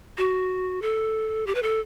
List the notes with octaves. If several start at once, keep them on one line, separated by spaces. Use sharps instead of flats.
F#4
A4
G4
B4
A4